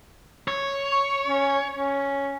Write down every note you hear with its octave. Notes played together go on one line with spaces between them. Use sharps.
C#5
C#6
C#4
C#4